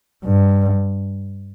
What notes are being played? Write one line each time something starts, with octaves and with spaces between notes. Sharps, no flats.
G2